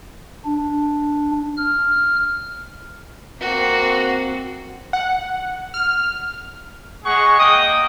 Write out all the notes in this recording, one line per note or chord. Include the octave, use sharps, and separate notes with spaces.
D4
F6
A#3 C4 F#4
F#5
F6
G#3 G#4 F#5 C#6
A#3 D#5 G5 D#6